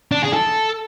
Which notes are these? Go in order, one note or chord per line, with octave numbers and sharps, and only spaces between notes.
D4
G#4
A4